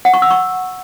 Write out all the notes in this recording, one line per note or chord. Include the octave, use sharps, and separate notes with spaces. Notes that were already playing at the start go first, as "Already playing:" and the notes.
F#5
C#6
E6
C#6